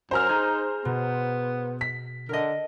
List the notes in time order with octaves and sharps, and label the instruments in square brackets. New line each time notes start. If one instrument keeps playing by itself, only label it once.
[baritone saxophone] F#2 [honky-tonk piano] C5 A#5 F6
[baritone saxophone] D#4 [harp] G#4
[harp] B2 [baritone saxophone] B3
[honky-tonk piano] B6
[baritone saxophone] D3 [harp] A#4 D#5